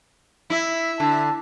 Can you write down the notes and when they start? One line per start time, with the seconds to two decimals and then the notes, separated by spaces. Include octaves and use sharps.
0.50 E4 E5
1.00 D3 A5